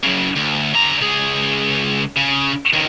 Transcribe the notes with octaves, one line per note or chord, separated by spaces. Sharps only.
F#2 C#3
D2
D3 A#5
C#2 G#4
C#3
C#2 D#3